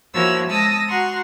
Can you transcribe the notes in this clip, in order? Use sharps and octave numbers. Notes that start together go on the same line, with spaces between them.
F3 A#3 E4 F#4 C#5 E6
G#3 A5 D#6 E6 A#6
F#4 F#5 A#5 C6 C#6